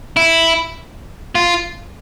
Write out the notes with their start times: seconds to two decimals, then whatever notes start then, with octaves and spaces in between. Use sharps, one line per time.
0.17 E4
1.35 F4